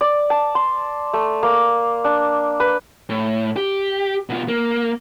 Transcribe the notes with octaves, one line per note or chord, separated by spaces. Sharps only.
D5
A5
C6
A3
A#3
D4
B4
A2
G4
B2 F4
A#3